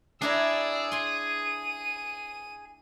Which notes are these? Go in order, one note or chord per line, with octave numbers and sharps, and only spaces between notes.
D4 E4 G#4 D5 A#5 E6
G#5 C6 D#7